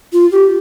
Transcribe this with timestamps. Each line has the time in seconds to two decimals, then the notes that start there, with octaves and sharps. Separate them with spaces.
0.13 F4
0.32 G4